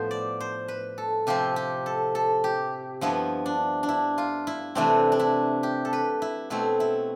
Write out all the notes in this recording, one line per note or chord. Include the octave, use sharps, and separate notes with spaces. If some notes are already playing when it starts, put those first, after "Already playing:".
Already playing: A2 F3 B3 C5
D5
C5
B4
A4
C3 F3 C4 G4
G4
A4
A4
G4
G2 F3 B3 E4
D4
D4
E4
F4
E4
C3 E3 A3 C4 D4
D4
E4
G4
A4
B4
E4
B2 A3 C4 E4
E4